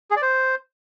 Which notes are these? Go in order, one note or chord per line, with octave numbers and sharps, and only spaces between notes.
G#4
D5
C5